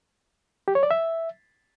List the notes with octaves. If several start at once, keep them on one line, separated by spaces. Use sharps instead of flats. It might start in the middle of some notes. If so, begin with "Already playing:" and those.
G4
C#5
D5
E5